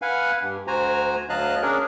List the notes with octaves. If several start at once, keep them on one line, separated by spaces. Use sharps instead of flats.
B4 F5 F#5 G#5
G2
D2 F#4 C5 G#5 A#5
D2 F#3 D#5 F5 A5 F#6
C#4 D4 G#4 A#4